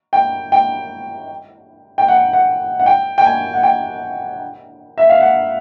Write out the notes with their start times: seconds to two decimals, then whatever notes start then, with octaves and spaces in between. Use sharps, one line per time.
0.13 G5
0.52 G5
1.98 G5
2.08 F#5
2.33 F#5
2.79 F#5
2.86 G5
3.18 G5
3.24 G#5
3.53 F#5
3.63 G5
4.98 E5
5.09 F5
5.20 F#5